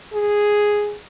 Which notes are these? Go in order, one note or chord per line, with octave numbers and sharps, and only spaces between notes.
G#4